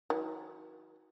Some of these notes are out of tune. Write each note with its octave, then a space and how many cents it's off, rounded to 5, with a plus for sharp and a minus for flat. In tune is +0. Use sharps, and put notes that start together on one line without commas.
D#3 +45 F#3 +0